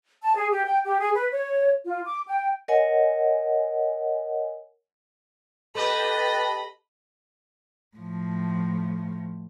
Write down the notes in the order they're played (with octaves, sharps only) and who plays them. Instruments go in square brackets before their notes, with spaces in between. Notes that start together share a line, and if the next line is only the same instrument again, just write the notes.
[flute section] A5
G#4
G4
G5
G4
G#4
B4
C#5
F4
D6
G5
[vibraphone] A#4 C#5 D#5 F#5 G#5
[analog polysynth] G4 B4 A5 [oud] A4 [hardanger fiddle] D#5 B5
[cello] A2 F3